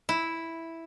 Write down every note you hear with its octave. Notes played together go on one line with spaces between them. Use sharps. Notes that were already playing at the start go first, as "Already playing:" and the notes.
E4